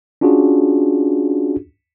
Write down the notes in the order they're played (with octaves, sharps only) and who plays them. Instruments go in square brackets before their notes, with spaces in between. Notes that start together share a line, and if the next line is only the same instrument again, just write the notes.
[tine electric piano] C#4 D4 F4 F#4 G#4